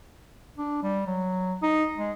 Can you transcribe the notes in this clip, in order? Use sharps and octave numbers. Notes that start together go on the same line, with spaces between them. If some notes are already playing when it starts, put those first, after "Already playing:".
D4
G3
F#3
D#4
G#3